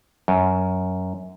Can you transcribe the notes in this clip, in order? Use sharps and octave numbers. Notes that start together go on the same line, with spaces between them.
F#2